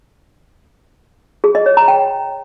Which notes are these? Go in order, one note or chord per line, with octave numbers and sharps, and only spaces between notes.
G#4
D#5
C#5
A#5
G5